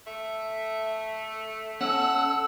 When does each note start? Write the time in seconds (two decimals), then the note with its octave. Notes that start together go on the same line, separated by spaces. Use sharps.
0.07 A3 E5
1.81 C#4 A4 F#5 E6